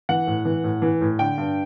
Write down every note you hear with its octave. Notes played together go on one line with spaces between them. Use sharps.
E3 F#5
A2
E3
A2
E3
A2
D3 G5
G2